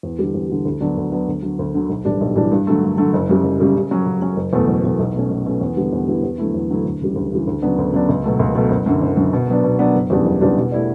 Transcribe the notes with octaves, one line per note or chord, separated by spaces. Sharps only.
E2
D3 G3
E2
D3 G3
D2
D3 F#3 B3 D4
D2
D3 F#3 B3 D4
D2
D3 F#3
D2
D3 F#3
B1
A2 E3 G3 D4
B1
A2 E3 G3 D4
G2
D3 F#3 A3
G2
D3 F#3 A3
F#1
F#2 C#3 G3
F#1
F#2 C#3 G3
C#3
F#3 C#4
C#3
F#3 C#4
F#1
E2 B2 A3
F#1
E2 B2 A3
B1
B2 A3 C#4
B1
B2 A3 C#4
E2
D3 G3 B3 E4
E2
D3 G3 B3 E4
E2
D3 F#3 A3 E4
E2
D3 F#3 A3 E4
D2
C#3 E3 G3
D2
C#3 E3 G3
D2
C#3 F#3 B3 D4
D2
C#3 F#3 B3 D4
C#2
B2 F#3 A3
C#2
B2 F#3 A3
F#1
F#2 D3
F#1
F#2 D3
B2
F#3 B3 D4
B2
F#3 B3 D4
F#1
E2 C#3 G3 D4
F#1
E2 C#3 G3 D4
B2
A3 E4 G4 D5